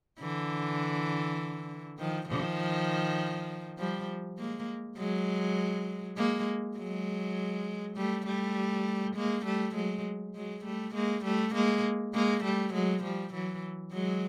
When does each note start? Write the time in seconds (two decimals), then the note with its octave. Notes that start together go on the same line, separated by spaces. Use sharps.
0.20 D3 E3
1.99 D#3 F3
2.29 D#3 F3
3.78 F3 G3
4.38 G#3 A#3
4.98 F#3 G#3
6.18 G#3 A#3
6.77 F#3 G#3
7.97 G3 A3
8.26 G3 A3
9.16 G#3 A#3
9.45 G3 A3
9.75 F#3 G#3
10.35 F#3 G#3
10.65 G3 A3
10.95 G#3 A#3
11.24 G3 A3
11.55 G#3 A#3
12.14 G#3 A#3
12.44 G3 A3
12.74 F#3 G#3
13.04 F3 G3
13.34 E3 F#3
13.93 F#3 G#3